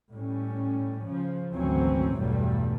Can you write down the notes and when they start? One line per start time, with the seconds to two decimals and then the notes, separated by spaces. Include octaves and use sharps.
0.13 A2 G3 C#4
1.05 C#3 F3
1.54 G#1 D2 E3 F#3 C4 C#4
2.18 B1 E2 G2 F#3 G3 A3